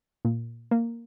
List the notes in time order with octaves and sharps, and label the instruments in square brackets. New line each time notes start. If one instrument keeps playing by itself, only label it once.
[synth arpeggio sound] A#2
A#3